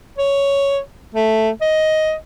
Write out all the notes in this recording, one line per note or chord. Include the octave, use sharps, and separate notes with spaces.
C#5
A3
D#5